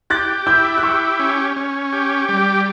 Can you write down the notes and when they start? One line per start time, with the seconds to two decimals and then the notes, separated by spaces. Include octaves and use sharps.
0.10 G4 F#6 A6
0.46 E4 E6 G6
0.77 F#6
0.83 G4 C#6 E6
1.19 C#4
1.56 C#4
1.93 G4
2.29 G3